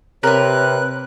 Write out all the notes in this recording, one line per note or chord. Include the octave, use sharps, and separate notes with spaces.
C3 A#4 B4 C#5 F#6